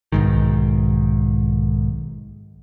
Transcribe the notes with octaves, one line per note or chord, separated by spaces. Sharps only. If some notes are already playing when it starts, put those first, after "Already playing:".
B1 G#2 D#3